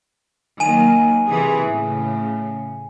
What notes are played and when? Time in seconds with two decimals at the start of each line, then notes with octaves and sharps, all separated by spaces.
0.60 D#3 F#3 A#3 G#5 D#7
1.28 C3 E3 G#4
1.65 A2 C#3